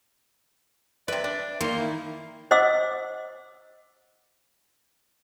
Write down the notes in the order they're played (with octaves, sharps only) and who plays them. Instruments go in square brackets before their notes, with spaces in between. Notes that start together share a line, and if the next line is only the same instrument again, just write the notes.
[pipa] C3 B4 [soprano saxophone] D5 [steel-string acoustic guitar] E5
[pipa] D4
[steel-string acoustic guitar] D#3 D#4 [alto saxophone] A#3 [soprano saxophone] C6
[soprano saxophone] E4
[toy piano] C5 D#5 F#5 D6 E6